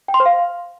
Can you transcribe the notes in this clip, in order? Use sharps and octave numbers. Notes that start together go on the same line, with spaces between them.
G5
C6
C5
F5